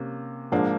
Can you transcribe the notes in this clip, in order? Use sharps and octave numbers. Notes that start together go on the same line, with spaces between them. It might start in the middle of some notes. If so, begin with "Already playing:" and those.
Already playing: C3 A#3 C#4
G#2 F3 A#3 D4